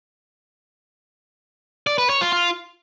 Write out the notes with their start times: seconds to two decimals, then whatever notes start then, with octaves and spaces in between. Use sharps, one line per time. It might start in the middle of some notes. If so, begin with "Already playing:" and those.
1.87 D5
1.98 B4
2.10 C#5
2.21 F4
2.33 F4